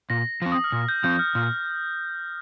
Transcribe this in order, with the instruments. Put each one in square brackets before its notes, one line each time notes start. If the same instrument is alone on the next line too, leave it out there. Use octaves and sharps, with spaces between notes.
[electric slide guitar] A#2 [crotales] A#6
[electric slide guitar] F3 C4
[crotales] D#6
F6
[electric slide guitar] A#2 [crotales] D#6
[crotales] G6
[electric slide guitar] F3 C4 [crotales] G6
[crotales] F6
[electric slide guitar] A#2 [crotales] F6